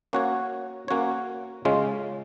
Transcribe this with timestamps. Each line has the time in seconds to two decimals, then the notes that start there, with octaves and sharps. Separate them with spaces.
0.13 A#3 C#4 F#4 C#5
0.88 A#3 C#4 F#4 C#5
1.65 C#3 G#3 C#4 F4